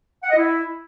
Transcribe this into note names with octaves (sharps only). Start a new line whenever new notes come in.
F#5
D#5
E4